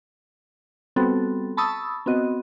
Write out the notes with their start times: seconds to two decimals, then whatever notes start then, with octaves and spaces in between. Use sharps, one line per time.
0.96 G3 B3 C4 F#4 A4
1.57 A5 B5 C#6 D#6 E6 A6
2.06 B3 C4 F#4 D#5